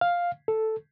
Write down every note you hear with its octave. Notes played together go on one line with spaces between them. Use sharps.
F5
A4